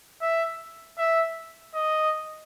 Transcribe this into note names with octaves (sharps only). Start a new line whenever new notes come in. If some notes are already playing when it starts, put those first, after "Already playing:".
E5
E5
D#5